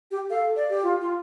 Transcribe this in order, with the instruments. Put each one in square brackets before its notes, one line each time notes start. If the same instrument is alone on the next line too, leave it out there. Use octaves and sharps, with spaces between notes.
[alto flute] G4
[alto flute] A4 [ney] F5
[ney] D5
[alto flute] G4
[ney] F4
F4